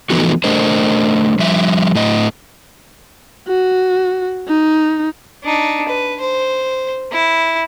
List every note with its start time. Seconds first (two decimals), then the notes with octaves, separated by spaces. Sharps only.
0.10 E3 F3 A3 B3 D#4 F#4
0.44 A3 D4 A#4 C5 D#5
1.39 F3 G3 E5
1.95 A2 D#5
3.48 F#4
4.48 D#4
5.44 D4 D#4
5.88 B4
6.20 C5
7.11 E4